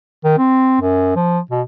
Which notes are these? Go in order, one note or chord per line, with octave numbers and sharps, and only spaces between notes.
D#3
C4
F#2
F3
B2